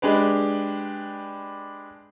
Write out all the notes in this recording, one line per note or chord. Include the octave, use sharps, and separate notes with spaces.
G#3 D4 G4 B4